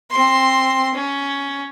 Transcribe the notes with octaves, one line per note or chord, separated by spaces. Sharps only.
C4 C6
C#4